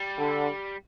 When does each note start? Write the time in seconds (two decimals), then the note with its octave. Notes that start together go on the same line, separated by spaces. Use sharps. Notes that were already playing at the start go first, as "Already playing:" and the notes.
Already playing: G3
0.18 D3